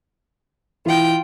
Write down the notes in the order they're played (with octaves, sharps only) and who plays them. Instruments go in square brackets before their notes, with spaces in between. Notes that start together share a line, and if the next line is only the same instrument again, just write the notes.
[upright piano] E3 [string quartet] F4 G5